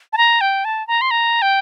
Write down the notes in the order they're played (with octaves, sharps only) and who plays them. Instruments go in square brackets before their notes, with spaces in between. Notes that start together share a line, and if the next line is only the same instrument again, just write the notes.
[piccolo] A5
A#5
G5
A5
A#5
C6
A#5
G5